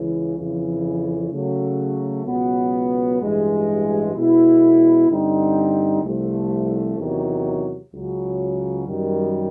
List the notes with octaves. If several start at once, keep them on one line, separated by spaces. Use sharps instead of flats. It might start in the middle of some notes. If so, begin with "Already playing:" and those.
Already playing: C#2 C#3 E3
F2 C#3 E3
C#3 F#3 A3
C#2 B2 F#3 B3
A1 G2 E3 G#3
B2 G#3 B3 E4
G2 D3 G3 C4 D#4
C2 C3 F3 A3
E2 C3 D#3 F#3
C#2 C#3 F#3
F#2 D#3 G3